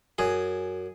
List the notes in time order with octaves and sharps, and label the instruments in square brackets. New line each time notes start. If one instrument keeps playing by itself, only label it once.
[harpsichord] F#2 G#4